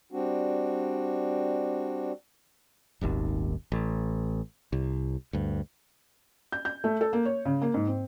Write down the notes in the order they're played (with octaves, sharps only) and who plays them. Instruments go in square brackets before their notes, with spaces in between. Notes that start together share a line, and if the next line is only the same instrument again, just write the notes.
[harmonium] G3 C4 D4 F#4
[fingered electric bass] D#1 G#1 D#2
A1
C2
D2 G2
[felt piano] G6
G6
A3
A4
A#3
C#5
C#3
A#3
G#2
C4